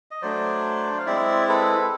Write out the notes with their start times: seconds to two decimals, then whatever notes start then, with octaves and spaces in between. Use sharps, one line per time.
0.11 D#5
0.22 F#3 A3 D4 C5 D5
0.98 F5
1.06 G#3 C4 E4 D5 E5
1.49 A4 B4